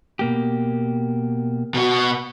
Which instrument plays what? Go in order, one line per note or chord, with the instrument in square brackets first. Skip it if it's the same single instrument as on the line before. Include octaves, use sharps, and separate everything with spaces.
[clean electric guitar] B2 A#3 G4
[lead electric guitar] B2 F#4